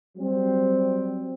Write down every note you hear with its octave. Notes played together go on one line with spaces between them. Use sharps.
F#3 G3 C4